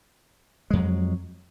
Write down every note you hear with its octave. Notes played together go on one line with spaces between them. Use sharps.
F2 F#3 G#3